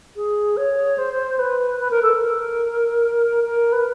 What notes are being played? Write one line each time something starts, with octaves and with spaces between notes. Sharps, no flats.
G#4
C#5
C5
B4
B4
A#4
A4
A#4
A#4
B4